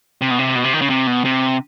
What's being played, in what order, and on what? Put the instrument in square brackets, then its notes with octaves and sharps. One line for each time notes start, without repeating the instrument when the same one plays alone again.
[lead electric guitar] C3
B2
C3
B2
C3
D#3
C#3
C3
B2
C3